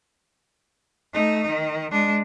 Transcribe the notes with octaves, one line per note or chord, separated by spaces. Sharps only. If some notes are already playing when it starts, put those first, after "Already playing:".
A3 D#4
D#3
G#3 D4